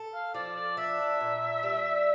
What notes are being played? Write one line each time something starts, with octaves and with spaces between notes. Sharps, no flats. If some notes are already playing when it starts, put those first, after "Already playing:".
Already playing: A4
F5
F3 D5
D5
D4 E5
A#2
G3